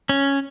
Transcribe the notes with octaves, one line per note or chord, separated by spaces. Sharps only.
C#4